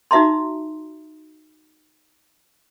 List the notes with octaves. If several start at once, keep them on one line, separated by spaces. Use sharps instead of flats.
D#4 F#4 E5 A#5 C6